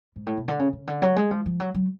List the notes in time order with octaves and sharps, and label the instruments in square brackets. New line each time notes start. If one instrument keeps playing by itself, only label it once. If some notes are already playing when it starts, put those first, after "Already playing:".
[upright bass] G#2
A2
B2
D3
C#3
C#3
D3
F#3
G#3
F3
F3
F#3
F#3